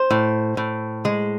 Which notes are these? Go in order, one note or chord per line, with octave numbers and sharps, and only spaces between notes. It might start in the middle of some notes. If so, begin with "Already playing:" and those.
Already playing: C5
A2
A2
G#3